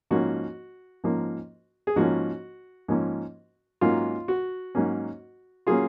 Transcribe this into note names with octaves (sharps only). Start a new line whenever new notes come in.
G#2 F3 A#3 C#4 F#4
G#2 F3 A#3 C#4
G#4
G#2 F3 A#3 C#4 F#4
G#2 F3 A#3 C#4
G#2 F#3 A#3 C#4 F4
F#4
G#2 F#3 A#3 C#4
F#3 A#3 C#4 F4 G#4